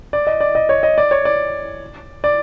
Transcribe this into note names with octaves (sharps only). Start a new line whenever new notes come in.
D5
D#5
D5
D#5
C#5
D#5
D5
C#5
D5
D5